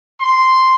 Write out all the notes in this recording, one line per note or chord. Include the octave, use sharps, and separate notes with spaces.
C6